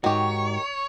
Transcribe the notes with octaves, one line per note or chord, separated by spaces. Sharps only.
G#2 D#3 F#4 G4 C#5